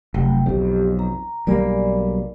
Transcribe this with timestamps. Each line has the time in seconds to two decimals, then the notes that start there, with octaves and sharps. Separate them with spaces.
0.14 F1 F#3 A3 G5
0.46 B1 F2 G4
0.99 A#5
1.47 B1 G3 A#3 D5 G#5 B5